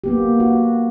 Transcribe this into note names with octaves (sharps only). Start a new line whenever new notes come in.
A#3 B3 G4
F#4